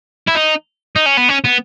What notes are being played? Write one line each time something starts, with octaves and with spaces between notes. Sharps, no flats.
E4
D#4
D#4
C#4
B3
C#4
B3